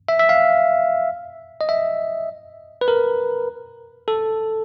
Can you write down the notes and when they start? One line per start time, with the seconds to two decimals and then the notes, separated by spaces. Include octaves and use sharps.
0.09 E5
0.19 E5
0.29 F5
1.61 D#5
1.69 E5
2.81 B4
2.88 A#4
4.08 A4